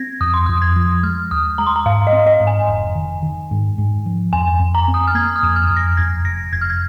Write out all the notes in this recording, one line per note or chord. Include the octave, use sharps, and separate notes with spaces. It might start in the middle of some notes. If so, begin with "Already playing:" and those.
Already playing: C4 G#6 A#6
F2 D#6
C6
F2 D#6
G#6
F3
G#3 F6
D#2 D#6
G#3 A#5
C6
A#5
G#2 F5
D#5
C4
D#5
G#2
G#5
F1
D#3
D#3
G#2
G#2
F3
F2 G#5
F2
A#5
C4
D#6
F6
A#3 G#6
D#6
F2
F6
F2
A#6
F2 G#6
F1 A#6
F1 G#6
F6
G#6